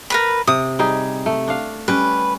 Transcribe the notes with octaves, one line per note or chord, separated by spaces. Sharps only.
A#4 B4 B5
C3 D#6
G3 D#4 G#4
A3
D4 F5
G3 C#4 B4